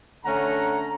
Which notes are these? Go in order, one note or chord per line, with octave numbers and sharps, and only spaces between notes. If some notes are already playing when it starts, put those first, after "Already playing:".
D3 A3 C#4 F#5 A#5